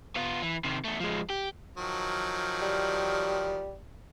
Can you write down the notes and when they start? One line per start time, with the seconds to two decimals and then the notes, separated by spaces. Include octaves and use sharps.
0.15 B3 F4
0.42 E3
0.64 C3 D#3
0.85 E2 A3
1.01 F3 G#3
1.30 G4
1.77 D#3 F3 F#3
2.62 G3